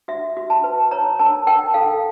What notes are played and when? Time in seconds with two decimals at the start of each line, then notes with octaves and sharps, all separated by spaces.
0.08 F#4 E5
0.37 F#4
0.50 A5
0.64 B4
0.91 C#5 A#5
1.19 A#4 A5
1.47 A#4 G5
1.74 A4 F5